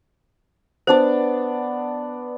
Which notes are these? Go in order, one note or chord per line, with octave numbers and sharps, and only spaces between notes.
B3 D4 C5 D5